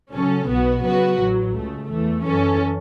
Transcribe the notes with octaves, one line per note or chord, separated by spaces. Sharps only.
C#3 F#3 C#4 A4
B1 B2 B3 F#4
C#3 F#3 B3 F#4 B4
A1 A2 F#3
C#2 C#3 A3
E2 E3 A3
F#2 E3 C#4 A4